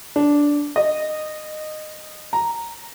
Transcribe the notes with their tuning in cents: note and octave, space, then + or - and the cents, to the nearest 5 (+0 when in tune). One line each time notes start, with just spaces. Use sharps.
D4 -10
D#5 -15
A#5 +0